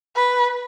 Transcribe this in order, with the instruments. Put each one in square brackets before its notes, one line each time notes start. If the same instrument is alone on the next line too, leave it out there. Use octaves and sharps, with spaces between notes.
[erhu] B4